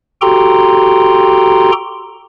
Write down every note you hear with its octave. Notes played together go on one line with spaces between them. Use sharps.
F#4 G4 A4 G5 A#5 C6